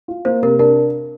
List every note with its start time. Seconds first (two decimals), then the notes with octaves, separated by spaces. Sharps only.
0.08 F4
0.25 A#3 C5
0.42 C3 A#4
0.59 D4 A#4